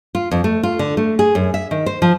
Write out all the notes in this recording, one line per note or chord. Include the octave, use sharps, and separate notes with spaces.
F4
F2
A3
F4
D3
A3
G#4
F#2
E5
D#3
C5
F3